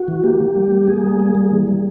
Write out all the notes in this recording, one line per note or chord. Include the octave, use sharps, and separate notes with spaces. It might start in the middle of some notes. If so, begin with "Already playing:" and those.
Already playing: F#4
E3
A#3 G4
A#3
G3
A#3
A#3 G#4
G3
A#3
G3
E3
G3